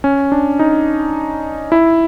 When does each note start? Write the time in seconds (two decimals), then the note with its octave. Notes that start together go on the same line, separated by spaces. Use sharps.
0.04 C#4
0.32 D4
0.59 D#4
1.72 E4